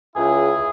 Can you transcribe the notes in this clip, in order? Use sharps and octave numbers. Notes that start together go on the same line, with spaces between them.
C#2 E4 G#4